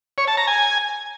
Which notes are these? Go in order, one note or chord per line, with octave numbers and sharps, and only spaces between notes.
C#5
A5
A#5
G#5